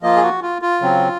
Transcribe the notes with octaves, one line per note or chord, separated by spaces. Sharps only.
F3 A#3 F4 D#5
G#4
F#4
F4
F4
C#3 F#3 C4